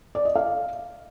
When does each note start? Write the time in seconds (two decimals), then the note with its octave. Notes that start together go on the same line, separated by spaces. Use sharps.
0.15 D5
0.25 D#5
0.36 F5